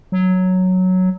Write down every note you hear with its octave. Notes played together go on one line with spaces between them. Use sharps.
F#3